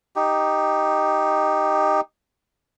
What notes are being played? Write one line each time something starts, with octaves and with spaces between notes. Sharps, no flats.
D#4 G4